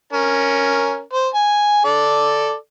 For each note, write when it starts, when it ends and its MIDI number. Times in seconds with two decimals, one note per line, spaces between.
0.13 1.01 61
0.13 1.01 70
1.13 1.28 72
1.34 1.83 80
1.85 2.55 69
1.85 2.55 74